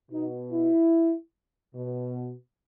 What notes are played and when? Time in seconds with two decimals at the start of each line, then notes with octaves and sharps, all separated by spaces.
0.11 B2 D#4
0.52 E4
1.75 B2